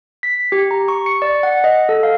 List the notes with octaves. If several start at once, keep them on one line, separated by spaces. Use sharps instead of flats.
B6
G4
A#5
C#6
C#7
D5
F#5
D#5
A4
F5